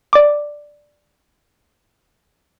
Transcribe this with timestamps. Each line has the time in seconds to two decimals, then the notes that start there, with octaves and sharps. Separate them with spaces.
0.13 D5 D6